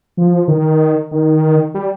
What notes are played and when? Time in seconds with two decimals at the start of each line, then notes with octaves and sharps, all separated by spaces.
0.17 F3
0.48 D#3
1.11 D#3
1.74 G3